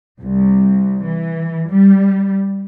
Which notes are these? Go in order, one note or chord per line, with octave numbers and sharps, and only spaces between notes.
C2
E3
G3